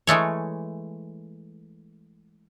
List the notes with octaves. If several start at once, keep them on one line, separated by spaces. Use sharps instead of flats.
E3 G#3 A3 C#5